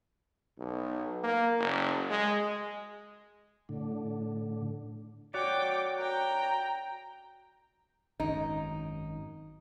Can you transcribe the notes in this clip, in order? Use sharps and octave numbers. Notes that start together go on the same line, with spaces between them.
B1
A#3
F#1
G#3
A2 D3
F#4 C#5 D5 G5 D6
G5 A#5
G#1 F#2 D#4